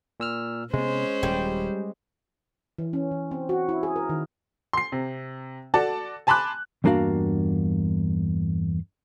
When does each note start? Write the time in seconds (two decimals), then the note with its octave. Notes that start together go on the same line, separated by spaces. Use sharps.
0.20 A#2 E6 F6
0.73 C3 G#3 B3 C#4 C5
1.23 D#1 G3
2.79 E3
2.93 C#4
3.11 E3
3.31 C4
3.49 F#4
3.69 E4
3.83 G#4
3.96 A#4
4.09 D#3
4.73 C6 C7
4.92 C3
5.74 F#4 A4 D5 A5
6.27 G#5 A5 B5 C6 D6 F#6
6.84 E2 G2 A#3 D4 F#4 F5